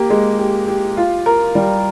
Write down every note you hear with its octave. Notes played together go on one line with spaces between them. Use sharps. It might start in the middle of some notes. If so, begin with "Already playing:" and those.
Already playing: A#3 G4
G#3
G4
G4
F4
A#4
G3